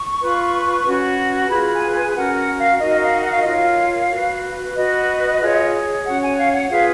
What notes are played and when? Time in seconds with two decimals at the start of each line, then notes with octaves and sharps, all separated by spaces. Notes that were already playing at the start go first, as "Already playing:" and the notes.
Already playing: C#6
0.21 F4 B4
0.86 C#4 F#4 B4
1.50 F4 G#4 B4 B5
1.73 G#5
1.94 G#5
2.15 C#4 F#4 A#4 F#5
2.37 F#5
2.59 F5
2.81 D#4 F#4 A#4 D#5
3.02 F5
3.24 F#5
3.33 F5
3.43 F4 A#4 C#5 D#5
3.53 F5
4.11 F#4 B4
4.75 F#4 B4 D#5
5.40 F4 G#4 C#5
6.05 C#4 F#4 C#5 F#5
6.22 G#5
6.37 F5
6.53 F#5
6.71 F4 G#4 B4 F5